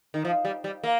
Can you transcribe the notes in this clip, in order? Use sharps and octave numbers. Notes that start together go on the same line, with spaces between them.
D#3
F3
G3
G3
A#3